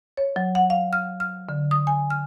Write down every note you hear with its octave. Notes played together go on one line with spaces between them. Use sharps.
C#5
F#3
F#5
F5
F6
F6
D3
D#6
G#5
F6